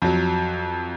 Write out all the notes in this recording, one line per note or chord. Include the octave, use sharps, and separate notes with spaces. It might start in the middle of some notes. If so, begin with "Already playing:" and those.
F2 F#3